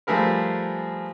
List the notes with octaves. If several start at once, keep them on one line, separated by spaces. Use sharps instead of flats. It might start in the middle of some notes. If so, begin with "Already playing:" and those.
F3 G3 A3 G#4 A#4 B4